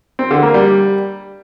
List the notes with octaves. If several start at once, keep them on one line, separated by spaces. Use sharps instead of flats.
C4
D3
A#3
G3